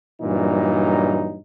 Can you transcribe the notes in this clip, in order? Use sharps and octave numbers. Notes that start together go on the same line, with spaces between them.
G2 A#2 E3 F#3 D#4